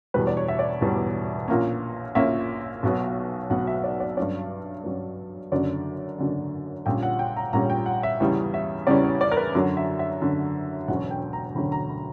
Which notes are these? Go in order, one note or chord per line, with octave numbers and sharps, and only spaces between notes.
E1 E2 B2 G3 B4
D5
C#5
E5
D5
E1 E2 B2 G3
A#1 A#2 A#3 C#4
A#1 A#2 A#3 C#4 E5
B1 B2 F#3 B3
B1 B2 F#3 B3 F#5
E5
D5
D5
G2 F#3 C#4 D5
G2 F#3 C#4
F#1 F#2 D3 F#3 C#4 D5
F#1 F#2 D3 F#3 C#4
A#1 A#2 G3 C#4 G5
F#5
G5
A#5
A#1 A#2 G3 C#4 A#5
G5
F#5
E5
E2 C#3 E3 G3 C#4
E5
E2 C#3 E3 G3 C#4 D5
C#5
D5
A#4
B4
F#2 D3 F#3 A#4
E5
E5
F#2 D3 F#3
E1 D2 D3 F#3 C#4 F#5
G5
A#5
E1 D2 D3 F#3 C#4 B5
A#5
B5